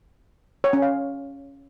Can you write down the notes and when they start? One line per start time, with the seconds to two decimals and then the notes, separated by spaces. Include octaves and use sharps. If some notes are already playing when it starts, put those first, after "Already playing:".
0.64 C#5
0.73 C#4
0.82 F5